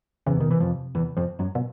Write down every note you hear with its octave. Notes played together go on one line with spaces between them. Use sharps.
E2 C#3 E3
C3
B2 D#3
C3 E3
F2 F3
E2 E3
F2 F3
F#2 F#3
B2